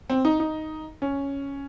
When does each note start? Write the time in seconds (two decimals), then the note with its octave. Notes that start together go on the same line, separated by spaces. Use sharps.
0.10 C4
0.25 D#4
0.40 D#4
1.02 C#4